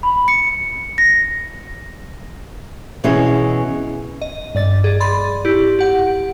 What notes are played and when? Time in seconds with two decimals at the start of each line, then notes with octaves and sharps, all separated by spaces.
0.03 B5
0.28 C#7
0.98 A#6
3.04 B2 E3 C#4 E4 G#4 D#5
4.22 D#5
4.55 G2 D5 A6
4.84 G#4
5.00 D5 B5 C6 A6
5.45 E4 G4
5.79 G4 F#5